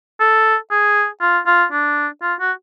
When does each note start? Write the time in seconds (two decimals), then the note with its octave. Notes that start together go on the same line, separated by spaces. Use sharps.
0.20 A4
0.71 G#4
1.21 F4
1.47 F4
1.72 D4
2.22 F4
2.40 F#4